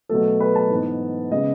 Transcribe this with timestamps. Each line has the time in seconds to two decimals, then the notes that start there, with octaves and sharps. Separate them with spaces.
0.09 B2 F#3 A3 A4
0.40 B4
0.55 A5
0.70 G#2 E3 B3
1.31 C#3 G#3 B3 D#5